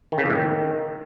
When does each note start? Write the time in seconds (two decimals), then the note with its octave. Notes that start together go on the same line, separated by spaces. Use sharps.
0.12 D#3
0.18 C#3
0.24 F2
0.30 A2
0.36 D#3